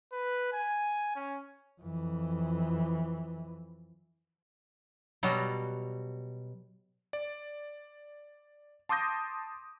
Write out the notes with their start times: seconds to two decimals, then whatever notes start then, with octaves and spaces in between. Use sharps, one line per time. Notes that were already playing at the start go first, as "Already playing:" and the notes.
0.12 B4
0.53 G#5
1.16 C#4
1.81 F2 E3
5.23 B2 F#3 G3
7.13 D5
8.89 A5 C6 D6 D#6 G6 A#6